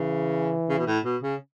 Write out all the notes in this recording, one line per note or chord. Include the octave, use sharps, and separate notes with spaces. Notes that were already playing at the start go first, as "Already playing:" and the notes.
Already playing: C#3 E3
C#3
B2
A2
B2
C#3